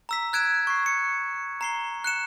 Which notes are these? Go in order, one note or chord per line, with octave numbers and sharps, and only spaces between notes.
A#5 E6 B6
F#6 G#6 D7 E7
C#6 C7
C#7
A#5 C7 G7
F#6 C#7 E7